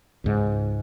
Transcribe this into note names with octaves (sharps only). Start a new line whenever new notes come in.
C#2 G#2